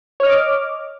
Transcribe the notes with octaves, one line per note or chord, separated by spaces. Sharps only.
C#5 D#5 D6 F6